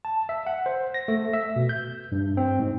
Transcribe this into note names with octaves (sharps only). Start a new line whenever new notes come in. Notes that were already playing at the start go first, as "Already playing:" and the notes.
A5
E5
F#5
C5
A#6
A3
E5
B2
G6
G2
C4
G#2